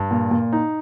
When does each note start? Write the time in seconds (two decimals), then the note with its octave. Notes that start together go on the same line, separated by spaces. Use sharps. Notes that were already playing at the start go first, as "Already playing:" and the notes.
Already playing: G2
0.11 A#2
0.31 A#2
0.52 D#4